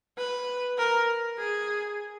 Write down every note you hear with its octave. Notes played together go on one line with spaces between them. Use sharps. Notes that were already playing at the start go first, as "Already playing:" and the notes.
B4
A#4
G#4